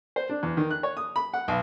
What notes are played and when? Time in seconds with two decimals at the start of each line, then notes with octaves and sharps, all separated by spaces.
0.16 C5
0.29 D4
0.43 E2
0.57 D#3
0.71 F#6
0.83 C#5
0.97 D#6
1.16 B5
1.34 F#5
1.48 B1